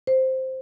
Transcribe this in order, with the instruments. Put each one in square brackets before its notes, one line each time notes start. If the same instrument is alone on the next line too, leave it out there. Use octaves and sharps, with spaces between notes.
[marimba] C5